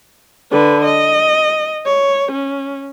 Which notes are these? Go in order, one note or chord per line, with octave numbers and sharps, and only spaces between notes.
D3 B4
D#5
C#5
C#4